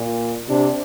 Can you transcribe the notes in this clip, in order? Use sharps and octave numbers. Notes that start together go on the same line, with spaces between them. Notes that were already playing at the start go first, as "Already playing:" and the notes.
Already playing: A#2
C3 D4